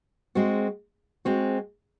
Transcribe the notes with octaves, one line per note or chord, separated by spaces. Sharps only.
G#3 C4 F#4
G#3 C4 F#4